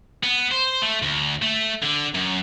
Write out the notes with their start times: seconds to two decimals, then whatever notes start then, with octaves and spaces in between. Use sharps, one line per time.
0.23 B3
0.51 C5
0.82 A3
1.02 D2
1.42 A3
1.83 D3
2.15 F#2